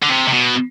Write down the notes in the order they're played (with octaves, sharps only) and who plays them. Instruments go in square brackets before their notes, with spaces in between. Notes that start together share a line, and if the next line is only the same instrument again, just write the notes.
[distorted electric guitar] D3
C3
C3
B2